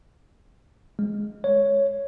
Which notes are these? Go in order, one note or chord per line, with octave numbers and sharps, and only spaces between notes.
G#3
C#5